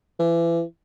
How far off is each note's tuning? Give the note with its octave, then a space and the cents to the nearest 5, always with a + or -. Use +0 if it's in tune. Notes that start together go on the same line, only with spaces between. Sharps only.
E3 +30